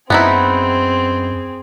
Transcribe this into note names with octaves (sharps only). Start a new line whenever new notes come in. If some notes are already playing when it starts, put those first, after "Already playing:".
F#2 B3 C4 D#4 E4 G#4